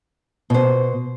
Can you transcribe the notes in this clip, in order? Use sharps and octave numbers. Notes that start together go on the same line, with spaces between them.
B2 C5